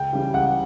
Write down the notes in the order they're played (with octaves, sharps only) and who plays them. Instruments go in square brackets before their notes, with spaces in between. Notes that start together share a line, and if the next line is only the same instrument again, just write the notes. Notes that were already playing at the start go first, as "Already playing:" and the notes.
Already playing: [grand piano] C#2 G5
C#3 E3 G3
C#2 F#5